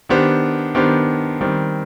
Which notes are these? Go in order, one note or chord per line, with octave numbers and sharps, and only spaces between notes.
D#3 B3 D4 G4 C5
D#3 B3 D4 G4 C5
D#3 G3 C4